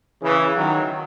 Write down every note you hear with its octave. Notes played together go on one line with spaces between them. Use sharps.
C#3 E3
D#3 F#3